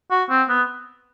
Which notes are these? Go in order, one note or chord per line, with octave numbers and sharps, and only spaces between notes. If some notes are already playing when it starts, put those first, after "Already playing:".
F#4
C4
B3